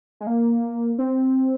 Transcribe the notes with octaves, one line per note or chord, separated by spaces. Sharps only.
G#3
A#3
C4